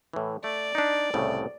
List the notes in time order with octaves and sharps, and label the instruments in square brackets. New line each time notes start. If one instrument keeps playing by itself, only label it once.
[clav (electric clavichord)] A2 E3
[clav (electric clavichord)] A3 [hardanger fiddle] D5
[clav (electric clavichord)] D4 D#4
C2 A2 C#3